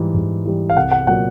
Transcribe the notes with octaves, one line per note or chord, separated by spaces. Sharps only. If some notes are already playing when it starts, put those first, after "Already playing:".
Already playing: G#2 E3 G3
G#2
E3 G3
F5
C2 F#5
F#5
A#2 F#3 F#5